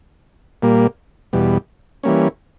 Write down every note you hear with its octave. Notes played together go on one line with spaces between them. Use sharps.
A#2 G3 A#3
E2 B2 G3
E3 G3 A#3 C#4